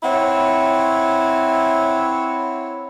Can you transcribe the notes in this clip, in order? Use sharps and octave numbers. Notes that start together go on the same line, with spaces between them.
C4 E4 C#5 F#5